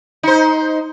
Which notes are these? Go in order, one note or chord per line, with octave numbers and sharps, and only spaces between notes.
D#4 C5